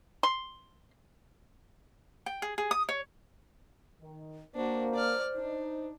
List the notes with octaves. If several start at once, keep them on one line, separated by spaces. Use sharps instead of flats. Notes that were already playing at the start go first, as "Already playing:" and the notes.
C6
G5
G#4
G#4
D#6
C#5
D#3
A#3 D4 F#4 C5
D5 F6
D4 D#4